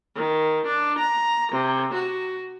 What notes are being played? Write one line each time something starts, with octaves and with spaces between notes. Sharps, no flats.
D#3
D4
A#5
C3
F#4